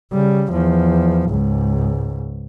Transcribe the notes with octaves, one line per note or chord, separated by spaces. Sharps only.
C#3 G3
E2 F3
C#2 G#2